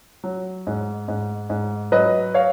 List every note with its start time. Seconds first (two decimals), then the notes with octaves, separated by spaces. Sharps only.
0.24 F#3
0.67 G#2
1.08 G#2
1.50 G#2
1.92 F#3 B4 D#5
2.34 C#5 F5